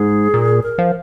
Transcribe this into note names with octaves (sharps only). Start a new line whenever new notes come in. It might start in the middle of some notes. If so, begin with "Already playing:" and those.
Already playing: G#2 G#4
A#2
A#4
F3